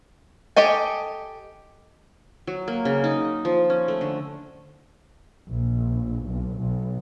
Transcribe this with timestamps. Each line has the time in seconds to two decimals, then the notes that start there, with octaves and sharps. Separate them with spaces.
0.56 G4 A4 D#5 G#5
2.47 F#3
2.68 A#3
2.85 C#3
3.04 D#4
3.45 F3
3.70 C#4
3.88 A3
4.01 D3
5.49 A#1
6.27 B1
6.59 B1